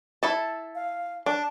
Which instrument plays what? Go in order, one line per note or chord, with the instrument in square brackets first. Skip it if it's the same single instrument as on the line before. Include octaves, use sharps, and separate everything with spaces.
[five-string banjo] E4 A4 A5
[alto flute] F5
[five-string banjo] D4 [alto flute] A5